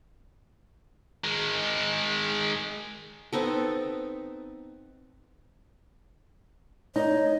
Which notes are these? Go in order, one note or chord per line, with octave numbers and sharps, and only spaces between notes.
D#3 G#3
B3 C4 D#4 A4
D#4 C#5